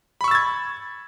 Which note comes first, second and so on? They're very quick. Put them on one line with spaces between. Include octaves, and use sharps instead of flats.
B5 C#6 E6 A6 G#6